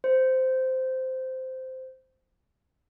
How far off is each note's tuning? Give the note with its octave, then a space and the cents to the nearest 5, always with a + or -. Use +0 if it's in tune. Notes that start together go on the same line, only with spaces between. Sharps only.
C5 -10